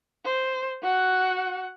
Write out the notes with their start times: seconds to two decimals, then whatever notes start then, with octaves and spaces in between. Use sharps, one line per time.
0.25 C5
0.83 F#4 F#5